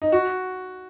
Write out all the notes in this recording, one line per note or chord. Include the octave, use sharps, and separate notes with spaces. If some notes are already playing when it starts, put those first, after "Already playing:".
D#4
F#4